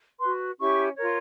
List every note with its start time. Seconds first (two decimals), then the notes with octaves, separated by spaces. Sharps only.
0.20 F#4 B4 C6
0.59 C#4 E4 G4 C#6
0.96 F4 A#4 C#5